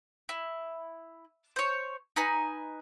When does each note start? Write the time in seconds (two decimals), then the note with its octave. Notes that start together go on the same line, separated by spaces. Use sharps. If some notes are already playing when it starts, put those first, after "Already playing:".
0.29 E4
1.56 C5 C#5
2.16 D#4 B4 G#5